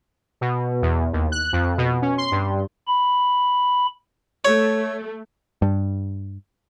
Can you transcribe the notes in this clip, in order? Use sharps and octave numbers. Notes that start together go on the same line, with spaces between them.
B2
E2
D#2
F#6
F2
B2
C#4
C6
G2
B5
A3 C#5
G2